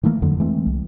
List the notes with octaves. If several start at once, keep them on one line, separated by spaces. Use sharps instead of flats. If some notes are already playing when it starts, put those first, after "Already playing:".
D#3 E3 A3 A#3
F2 D3 F#3
E3 G#3 A3 C4
C2